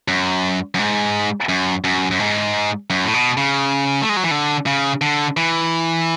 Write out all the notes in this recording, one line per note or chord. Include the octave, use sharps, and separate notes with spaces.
F#2
F#2
G#2
F#2
F#2
F#2
G#2
F#2
A2
B2
C#3
A3
G#3
F#3
E3
D3
C#3
D3
E3